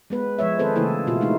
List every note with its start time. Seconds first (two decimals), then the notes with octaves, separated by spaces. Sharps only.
0.10 G#3 B3 B4
0.39 F3 G#3 C#5 E5
0.59 D#3 C4 G#4 A4 B4 C5
0.76 C#3 E3 A3 A#3 E4 A4
1.07 B2 F4 F#4
1.21 G#3 A3 D#4 E4